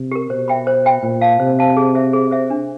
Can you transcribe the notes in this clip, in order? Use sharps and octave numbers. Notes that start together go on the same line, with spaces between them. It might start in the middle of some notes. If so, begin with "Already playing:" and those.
Already playing: C3
G4 A#4
B2 C5
E5 G5 B5
C5
E5 G5 B5
A#2 C5
F5 A5
C3 C5
F5 A5
G#4
C5 E5
G#4
C5 E5
D4